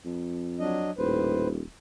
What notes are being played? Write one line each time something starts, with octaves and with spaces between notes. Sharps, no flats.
F2
F#3 D4 D#5
D#1 A2 B4 C5